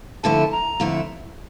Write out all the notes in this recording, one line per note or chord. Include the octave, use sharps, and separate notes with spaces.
F2 D3 A3 E4 A5
A#5
F2 D3 A3 E4